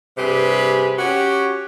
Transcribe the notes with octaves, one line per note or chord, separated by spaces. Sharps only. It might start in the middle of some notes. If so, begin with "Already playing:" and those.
G2 C3 G4 G#4 B4
C#4 F#4 G4